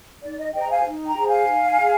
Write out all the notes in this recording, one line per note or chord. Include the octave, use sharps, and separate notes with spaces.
D#4 D5
D#5
G#4 C5 D#5 G5
A#5
F5 G#5
D#4
G5 A#5
G#4 C5
F5 G#5
D#4
G#4